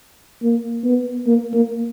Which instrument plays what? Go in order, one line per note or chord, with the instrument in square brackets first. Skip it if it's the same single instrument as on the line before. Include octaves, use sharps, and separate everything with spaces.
[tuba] A#3
B3
A#3
A#3